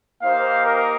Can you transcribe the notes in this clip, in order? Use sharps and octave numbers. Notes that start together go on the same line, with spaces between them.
A#3 D#4 G4 C5 F5
A#4